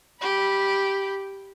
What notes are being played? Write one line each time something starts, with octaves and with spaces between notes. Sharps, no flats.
G4 B5